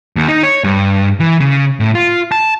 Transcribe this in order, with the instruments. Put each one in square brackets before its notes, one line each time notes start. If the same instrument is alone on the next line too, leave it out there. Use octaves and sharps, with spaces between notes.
[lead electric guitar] D#2
D#4
C#5
G2
E3
C#3
A2
F4
A5